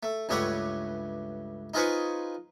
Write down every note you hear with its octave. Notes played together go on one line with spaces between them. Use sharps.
A3
C#2 G2 A3 G4 C#5 F#5
D#4 F4 G#4 B4 C5 C#6